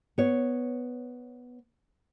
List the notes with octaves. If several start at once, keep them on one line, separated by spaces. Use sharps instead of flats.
B3 C#5